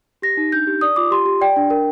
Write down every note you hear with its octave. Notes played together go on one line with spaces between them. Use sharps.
G4 A#6
D#4
D4 G6
G4
D5 D#6
F4 D6
G4 C6
G4
D5 G5
D4
A#4